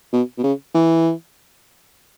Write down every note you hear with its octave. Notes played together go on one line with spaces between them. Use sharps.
B2
B2
C#3
E3